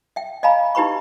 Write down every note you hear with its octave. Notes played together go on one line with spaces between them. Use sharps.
E5 G5
D#5 F5 G#5 A#5 B5
D#4 E4 G4 B4 B5 C#6